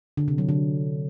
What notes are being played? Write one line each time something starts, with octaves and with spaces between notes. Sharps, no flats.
D3
C3
F#3
D3